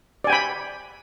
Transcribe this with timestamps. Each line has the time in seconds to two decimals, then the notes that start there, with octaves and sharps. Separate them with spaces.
0.24 D5
0.27 G#5
0.30 G5
0.33 B5